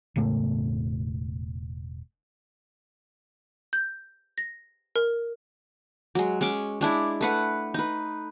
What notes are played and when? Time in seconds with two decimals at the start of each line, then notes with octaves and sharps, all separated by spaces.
0.16 E1 A2 C#3 A3
3.73 G6
4.38 A#6
4.96 A#4
6.15 F#3 G#3
6.41 G#3 C#4 D6
6.81 G#3 D4 E4
7.21 A3 B4 F#5
7.74 D#4 B4